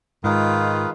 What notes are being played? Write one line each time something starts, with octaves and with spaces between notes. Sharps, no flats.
G#2 D#3 G#3 D#4 F4 B4 F5